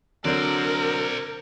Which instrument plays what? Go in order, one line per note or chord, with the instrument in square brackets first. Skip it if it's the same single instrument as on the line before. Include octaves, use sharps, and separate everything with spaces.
[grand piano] D3 F#3 [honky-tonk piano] C4 D4 [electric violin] A#4 [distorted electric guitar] C5 D5